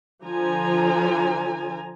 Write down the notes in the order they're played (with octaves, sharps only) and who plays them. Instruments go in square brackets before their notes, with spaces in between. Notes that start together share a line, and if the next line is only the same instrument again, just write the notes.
[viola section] D3 F3 G#5 A#5